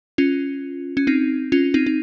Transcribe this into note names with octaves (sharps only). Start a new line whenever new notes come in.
C#4 F4
C#4
C4 D#4
C#4 F4
C4 D#4
D#4